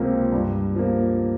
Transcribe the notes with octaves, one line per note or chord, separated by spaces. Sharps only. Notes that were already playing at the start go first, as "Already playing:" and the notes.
Already playing: C#2 C3 F3 A#3
G2
F3 A#3